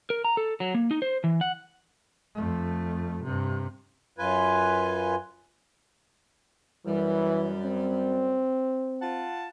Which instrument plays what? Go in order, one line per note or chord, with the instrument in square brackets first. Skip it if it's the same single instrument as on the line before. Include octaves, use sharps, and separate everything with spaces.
[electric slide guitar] A#4
A#5
A4
F#3
A#3
D#4
C5
E3
F#5
[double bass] F2 A3
G2 C3
[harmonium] F#2 F4 B4 G#5
[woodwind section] F#2 G3 [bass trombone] E3
[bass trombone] C4
[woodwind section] F4 F#5 A5